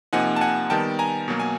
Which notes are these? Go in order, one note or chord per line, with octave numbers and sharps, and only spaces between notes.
C3 F3 A#3 D#4 F#5 G#5
A5
F#5 G#5
D#3 G3 B3 G5 A5
G#5 A#5
B2 F#3 A#3
G#5